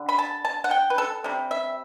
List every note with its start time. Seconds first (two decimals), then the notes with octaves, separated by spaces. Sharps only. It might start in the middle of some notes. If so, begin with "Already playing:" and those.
Already playing: D3 G3
0.09 B5
0.19 A5
0.45 A5
0.64 F#5
0.71 G5
0.90 B4
0.98 A4
1.24 C3 G3
1.51 E5